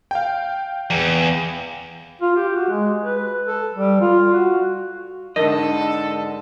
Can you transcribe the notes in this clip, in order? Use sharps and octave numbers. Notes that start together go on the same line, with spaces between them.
F5 G5
E2
F4
G4
F#4
G#3
B4
A4
G3
F4
F#4
G#2 D3 A4 A#4 D#5